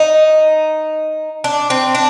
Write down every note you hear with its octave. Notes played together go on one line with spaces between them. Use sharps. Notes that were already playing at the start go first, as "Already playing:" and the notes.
Already playing: D#4
D4
C4
D4